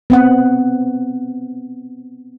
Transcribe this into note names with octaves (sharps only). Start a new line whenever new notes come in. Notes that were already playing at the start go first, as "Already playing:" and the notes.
B3 C4 F#5